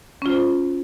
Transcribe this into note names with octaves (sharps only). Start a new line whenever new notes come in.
C#4 F4 C5